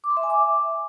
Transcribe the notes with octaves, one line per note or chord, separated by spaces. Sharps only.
D6
C6
E5
G#5
D6